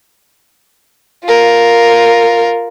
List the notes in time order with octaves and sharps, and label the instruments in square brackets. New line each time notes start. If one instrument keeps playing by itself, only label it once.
[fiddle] F4 A#4